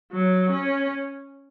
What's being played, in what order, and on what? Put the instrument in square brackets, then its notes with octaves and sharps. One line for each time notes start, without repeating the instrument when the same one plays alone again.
[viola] F#3
C#4